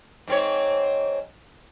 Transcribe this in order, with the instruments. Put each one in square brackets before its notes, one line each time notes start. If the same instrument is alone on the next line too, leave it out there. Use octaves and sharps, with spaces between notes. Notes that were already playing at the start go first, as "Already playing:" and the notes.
[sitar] G#2 C4 C#5